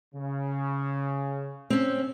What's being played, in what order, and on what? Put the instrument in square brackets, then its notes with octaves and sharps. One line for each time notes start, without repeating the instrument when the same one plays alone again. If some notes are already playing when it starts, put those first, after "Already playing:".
[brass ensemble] C#3
[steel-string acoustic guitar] C4 C#4